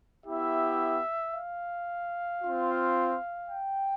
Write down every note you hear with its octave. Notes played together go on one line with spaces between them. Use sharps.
B3 E4 G4 E5
F5
C4 F4
G5